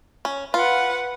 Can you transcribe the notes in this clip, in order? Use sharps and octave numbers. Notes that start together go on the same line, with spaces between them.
C#4
F4 B4 F#5